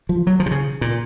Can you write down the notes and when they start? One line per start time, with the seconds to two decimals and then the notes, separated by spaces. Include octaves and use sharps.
0.09 F3
0.27 F#3
0.40 F3
0.46 C3
0.51 C#3
0.81 A#2